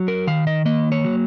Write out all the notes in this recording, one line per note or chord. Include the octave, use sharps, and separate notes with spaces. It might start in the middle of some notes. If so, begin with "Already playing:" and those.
Already playing: F#3
A#4
D#3 F5
D#5
A#3 D#5
C#5
F#3